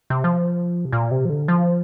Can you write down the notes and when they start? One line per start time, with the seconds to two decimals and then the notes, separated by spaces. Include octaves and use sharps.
0.10 C3
0.24 F3
0.85 C3
0.92 A#2
1.11 C3
1.25 F3
1.29 D3
1.48 F3